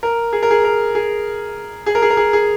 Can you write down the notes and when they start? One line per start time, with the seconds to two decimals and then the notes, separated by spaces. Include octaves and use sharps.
0.03 A#4
0.33 G#4
0.43 A#4
0.51 G#4
0.64 A#4
0.95 G#4
1.86 G#4
1.95 A#4
2.02 G#4
2.10 A#4
2.17 G#4
2.33 G#4